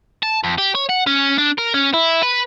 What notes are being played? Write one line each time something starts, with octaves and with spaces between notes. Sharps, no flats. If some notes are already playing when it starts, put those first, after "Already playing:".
A5
F2
G4
C#5
F#5
C#4
D4
A#4
C#4
E4
B4